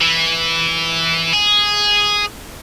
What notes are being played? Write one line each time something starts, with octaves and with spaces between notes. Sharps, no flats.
E3
G#4